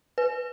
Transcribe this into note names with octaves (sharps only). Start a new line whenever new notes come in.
B4